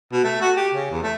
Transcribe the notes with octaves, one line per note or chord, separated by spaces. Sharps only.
B2
A3
F#4
G4
C#3
E2
A3